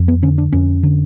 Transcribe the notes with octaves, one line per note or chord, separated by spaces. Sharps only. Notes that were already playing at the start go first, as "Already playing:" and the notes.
Already playing: F2
B3
D3 C#4
D4
F2 C#4
D3